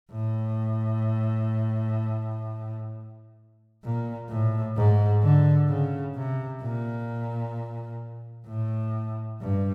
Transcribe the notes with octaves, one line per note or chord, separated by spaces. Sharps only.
A2
A#2
A2
G#2
D3
C#3
C3
A#2
A2
G2